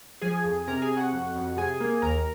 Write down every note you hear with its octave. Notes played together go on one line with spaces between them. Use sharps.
F3 G#4 G#5
F2
C3 A#4 A#5
G#4 G#5
C3
F#4 F#5
F2
F2
C3 G#4 G#5
A#3
D#2 A#4 A#5